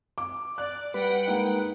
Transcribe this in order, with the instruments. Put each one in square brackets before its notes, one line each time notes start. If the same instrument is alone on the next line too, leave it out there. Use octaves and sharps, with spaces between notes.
[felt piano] D6
[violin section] D5 [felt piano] F#6
[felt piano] G3 [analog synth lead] B4 [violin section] F#5 G5 D7
[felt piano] G#3 A#3 D#4